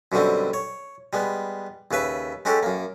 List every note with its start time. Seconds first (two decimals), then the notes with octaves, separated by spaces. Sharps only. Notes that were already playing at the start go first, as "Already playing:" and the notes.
0.12 F#2 B2 D3 G3 C4
0.54 C#5
1.13 G3 G#3 B3
1.91 D#2 C#3 B4 E5
2.45 G#3 C#4 F#4 G4 A4
2.63 F#2 A#3